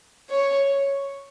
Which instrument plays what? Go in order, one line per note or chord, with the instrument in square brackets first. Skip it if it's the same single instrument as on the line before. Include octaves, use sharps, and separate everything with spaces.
[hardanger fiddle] C#5